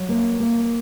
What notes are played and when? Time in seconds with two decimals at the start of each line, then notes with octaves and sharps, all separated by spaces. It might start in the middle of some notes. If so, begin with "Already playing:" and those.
Already playing: F#3
0.09 A#3
0.40 A#3